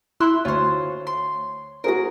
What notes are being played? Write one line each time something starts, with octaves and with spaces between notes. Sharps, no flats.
E4 C6 E6 F#6
D2 F4 C5 C#5
C6
F#4 G#4 A#4 C5 A#5